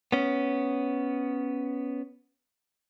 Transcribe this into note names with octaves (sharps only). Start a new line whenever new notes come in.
B3 C#4